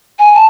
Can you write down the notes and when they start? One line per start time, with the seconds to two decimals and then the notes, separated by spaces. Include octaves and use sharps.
0.19 G#5
0.35 A5